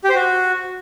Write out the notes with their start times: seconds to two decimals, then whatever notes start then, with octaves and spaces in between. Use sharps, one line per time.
0.04 G4
0.10 C5
0.15 F#4